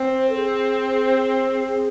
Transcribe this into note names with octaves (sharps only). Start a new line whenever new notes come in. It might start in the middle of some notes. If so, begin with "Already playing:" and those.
Already playing: C4 C5
A4
G#4
G#4